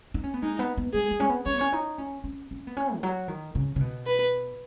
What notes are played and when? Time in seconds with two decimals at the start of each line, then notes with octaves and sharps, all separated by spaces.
0.14 D#4
0.23 C#4
0.33 B3
0.43 G#3 D#4
0.59 B3
0.77 B3
0.94 G#3 G#4
1.11 G#3
1.20 C#4
1.29 B3
1.46 C#4 C#5
1.53 B3
1.61 C#4
1.73 D#4
1.98 C#4
2.24 C#4
2.51 C#4
2.67 B3
2.77 C#4
2.95 D#3
3.03 F#3
3.28 D#3
3.55 C#3
3.76 C#3
3.81 B2
4.07 B4